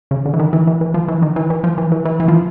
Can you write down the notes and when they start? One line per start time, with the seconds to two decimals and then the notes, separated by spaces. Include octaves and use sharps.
0.11 C#3
0.26 D3
0.34 E3
0.39 D#3
0.53 E3
0.67 E3
0.81 E3
0.94 F3
1.08 E3
1.22 D#3
1.36 E3
1.50 E3
1.64 F3
1.78 E3
1.92 E3
2.05 E3
2.20 E3
2.28 F3